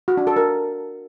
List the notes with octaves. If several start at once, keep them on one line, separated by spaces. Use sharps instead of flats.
F#4
D4
A4
A#4